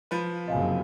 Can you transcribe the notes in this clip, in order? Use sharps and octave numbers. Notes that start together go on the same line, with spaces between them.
F3 B4
F#1 C3 D#5 F5 G#5